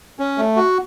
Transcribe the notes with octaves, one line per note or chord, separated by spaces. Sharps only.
C#4
A3
F#4